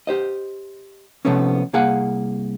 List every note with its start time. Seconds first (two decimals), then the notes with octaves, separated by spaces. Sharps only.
0.07 G4 C5 D#5
1.25 C3 F3 A3 B3 C#4
1.73 C2 A#3 G#4 F5 F#5